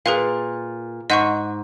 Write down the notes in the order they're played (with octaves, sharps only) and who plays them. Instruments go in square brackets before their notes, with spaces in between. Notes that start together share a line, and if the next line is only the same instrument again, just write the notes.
[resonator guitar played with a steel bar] A#2 [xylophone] G#4 B4 F5
[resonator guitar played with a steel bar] G#2 [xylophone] D#5 F#5 C#6